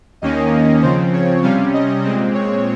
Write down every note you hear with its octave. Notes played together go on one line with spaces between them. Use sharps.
D#2 D#3 A#3 C#4 D#5
C#3 F3 C4 C5
C#5
C3 G3 C#4 F5
D#5
A#2 G#3 C4 D#5
C#5